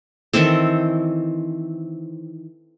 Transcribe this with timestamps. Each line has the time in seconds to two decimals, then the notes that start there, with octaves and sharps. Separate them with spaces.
0.33 D#3 E3 C4 A4